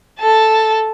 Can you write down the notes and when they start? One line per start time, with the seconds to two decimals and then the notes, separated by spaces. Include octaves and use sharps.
0.20 A4 A5